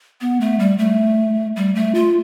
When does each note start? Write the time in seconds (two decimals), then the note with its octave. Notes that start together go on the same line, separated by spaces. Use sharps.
0.21 B3
0.41 A3
0.59 G3
0.78 A3
1.56 G3
1.75 A3
1.95 F4